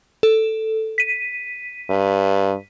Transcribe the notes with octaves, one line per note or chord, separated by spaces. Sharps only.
A4
B6 D#7
G2